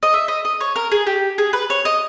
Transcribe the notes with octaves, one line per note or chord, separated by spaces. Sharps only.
D#5
E5
D#5
D#5
C#5
A#4
G#4
G4
G#4
B4
C#5
D#5